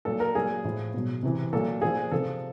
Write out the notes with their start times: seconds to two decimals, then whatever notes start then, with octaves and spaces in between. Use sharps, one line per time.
0.05 A#2 F#3 A4
0.20 A#4
0.35 A#2 F#3 G#4
0.64 A2 F3
0.94 B2 F#3
1.23 C3 E3
1.53 A#2 F#3 A4
1.82 A#2 F3 G#4
2.11 C3 F3 A4